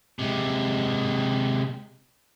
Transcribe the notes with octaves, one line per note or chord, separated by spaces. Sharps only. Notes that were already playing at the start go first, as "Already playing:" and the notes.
C3 G#3